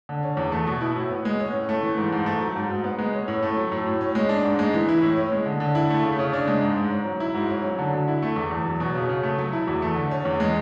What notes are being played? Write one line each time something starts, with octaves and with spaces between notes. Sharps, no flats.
D3
C#4
E2
A3
B2
E4
A2
B3
G#3
C#4
A2
A3
E3
G#2
G#2
A3
F#3
G#2
G#2
B3
G#3
C#4
A2
A3
F#3
A2
A2
C#4
G#3
D4
G#2
G#3
E3
E4
A2
C#4
G#3
D3
D3
E4
A3
C#3
C#3
D4
G#3
G#2
G#2
C#4
F#3
E4
G#2
C#4
F#3
D3
D3
E4
A3
E2
E2
F#3
B2
C#3
C#3
A3
F#3
E4
E2
A3
D3
C#4
E2
G#3